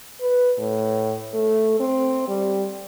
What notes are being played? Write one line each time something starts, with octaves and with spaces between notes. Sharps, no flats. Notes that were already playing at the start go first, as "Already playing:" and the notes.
B4
A2
A3
C4
G3